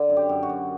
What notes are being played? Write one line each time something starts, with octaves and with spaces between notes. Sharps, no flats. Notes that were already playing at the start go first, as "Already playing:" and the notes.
Already playing: D3
F#2
G4
F#2
F#4
F#2